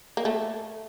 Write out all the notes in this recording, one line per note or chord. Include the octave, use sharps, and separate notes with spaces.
A#3
A3